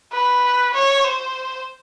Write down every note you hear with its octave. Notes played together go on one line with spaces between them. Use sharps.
B4
C#5
C5